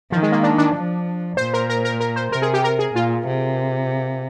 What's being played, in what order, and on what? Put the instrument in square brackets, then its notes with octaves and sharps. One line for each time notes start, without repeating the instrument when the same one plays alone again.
[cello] D#3 [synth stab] F3
[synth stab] G#3
A#3
D4
D4
[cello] F3
[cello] A#2 [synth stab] C5
[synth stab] A#4
A#4
A#4
A#4
C5
[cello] C3 [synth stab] A#4
[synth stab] G#4
G4
A#4
G#4
[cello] A#2 [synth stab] F4
[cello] C3